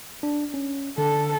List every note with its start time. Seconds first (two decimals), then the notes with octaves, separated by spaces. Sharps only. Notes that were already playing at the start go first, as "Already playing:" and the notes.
0.23 D4
0.54 C#4
0.98 D3 A4